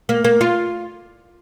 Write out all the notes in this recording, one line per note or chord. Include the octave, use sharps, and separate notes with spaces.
A#3
A#3
F4